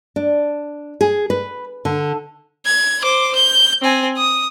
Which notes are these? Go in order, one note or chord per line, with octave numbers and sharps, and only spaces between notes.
D4
G#4
B4
D3
G#6
C5 D6
G6
C4 G#5
D#6